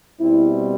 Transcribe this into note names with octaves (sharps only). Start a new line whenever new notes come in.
B2 G3 C4 E4